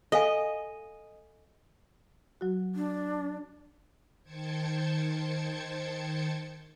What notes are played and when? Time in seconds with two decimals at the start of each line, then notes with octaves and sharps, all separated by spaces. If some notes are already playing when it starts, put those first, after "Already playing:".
0.12 A4 D#5 F5 G#5
2.41 F#3 F#4
2.75 D4
4.23 D#3 C5 G5 A5 G#6 C#7